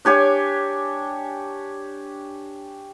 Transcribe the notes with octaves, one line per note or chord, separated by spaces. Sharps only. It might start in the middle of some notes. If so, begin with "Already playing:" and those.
D4 G4 C#5 G#5